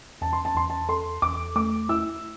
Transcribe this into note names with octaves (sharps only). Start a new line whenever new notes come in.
E2 A5
C6
A5
E2 C6
A5
A4 C6
E2 D6
A3 D6
E4 E6